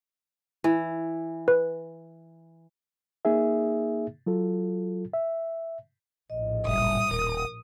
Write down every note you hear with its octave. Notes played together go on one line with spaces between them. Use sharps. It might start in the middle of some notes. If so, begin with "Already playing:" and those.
E3
B4
A#3 D#4 G#4 E5
F#3 F4 A4
E5
A#1 A2 D#5
F#1 G3 E5 D#6
D#1 A#4